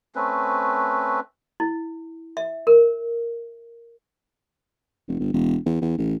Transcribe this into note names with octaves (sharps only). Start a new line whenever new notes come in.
A3 C4 C#4 B4
E4
E5
A#4
F1
G1
E1
E2
E2
A1